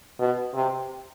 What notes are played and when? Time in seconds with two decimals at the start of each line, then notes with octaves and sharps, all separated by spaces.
0.19 B2
0.54 C3